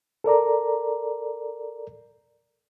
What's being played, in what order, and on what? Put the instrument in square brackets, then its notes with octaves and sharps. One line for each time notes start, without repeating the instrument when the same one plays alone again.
[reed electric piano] A4 A#4 D5 A#5